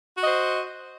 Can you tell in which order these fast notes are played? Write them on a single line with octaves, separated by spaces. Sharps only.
F#4 D#5 C5